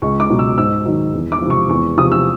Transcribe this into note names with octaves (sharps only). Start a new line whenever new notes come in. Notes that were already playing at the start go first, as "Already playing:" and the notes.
C#2 C#6
D6
B2 F#3
E6
G#2 E6
D#3 F#3
E2
D6
C3 F3
C#6
E2 C#6
C3 F3 D#6
E6